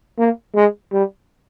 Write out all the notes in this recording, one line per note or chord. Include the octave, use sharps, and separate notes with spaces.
A#3
G#3
G3